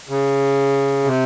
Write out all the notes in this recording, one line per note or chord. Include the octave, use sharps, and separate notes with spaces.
C#3
C3